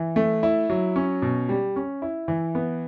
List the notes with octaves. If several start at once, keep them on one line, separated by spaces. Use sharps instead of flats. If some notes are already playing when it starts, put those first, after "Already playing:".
Already playing: E3
A3
E4
F#3
C#4
B2
G3
C#4
E4
E3
B3